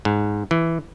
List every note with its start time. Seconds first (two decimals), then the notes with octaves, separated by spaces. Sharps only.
0.05 G#2
0.51 E3